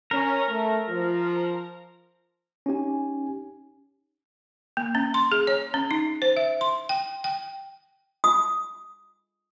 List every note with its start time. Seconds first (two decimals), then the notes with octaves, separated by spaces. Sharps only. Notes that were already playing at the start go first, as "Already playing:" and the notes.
0.11 C#4 A#4
0.47 A3
0.87 F3
2.66 C#4 D#4 G4 G#5
4.77 A#3
4.95 C#4
5.14 C6
5.32 G#4
5.47 C#5
5.74 C#4
5.91 D#4
6.22 C5
6.37 E5
6.61 C6
6.89 G5
7.24 G5
8.24 D#6